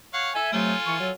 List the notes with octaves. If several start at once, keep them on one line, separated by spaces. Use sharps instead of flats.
C#5 F5 F#5
A4 E5 G#5
C3 F#3 A3 F4 A4 G#5
E3 C#6
F#3